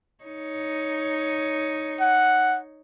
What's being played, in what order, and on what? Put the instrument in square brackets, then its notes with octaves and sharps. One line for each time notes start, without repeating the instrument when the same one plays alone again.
[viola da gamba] D#4 C#5
[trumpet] F#5